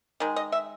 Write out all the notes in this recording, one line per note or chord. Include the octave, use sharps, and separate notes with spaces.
D#3 G#3
D#5
E5